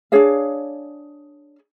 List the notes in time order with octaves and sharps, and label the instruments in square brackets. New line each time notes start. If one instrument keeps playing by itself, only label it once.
[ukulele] D4 G#4 C#5 F5